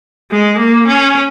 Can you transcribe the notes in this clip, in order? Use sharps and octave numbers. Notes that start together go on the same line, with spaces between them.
G#3
A#3
C#4